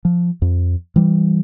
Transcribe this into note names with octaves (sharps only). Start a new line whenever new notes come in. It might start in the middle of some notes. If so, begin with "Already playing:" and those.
F3
F2
E3 G3